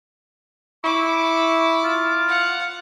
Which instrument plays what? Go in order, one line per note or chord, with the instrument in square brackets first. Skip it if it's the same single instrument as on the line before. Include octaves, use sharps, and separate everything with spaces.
[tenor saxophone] E4 [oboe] C#6 [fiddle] D6
[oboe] F4
[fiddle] F5 F#5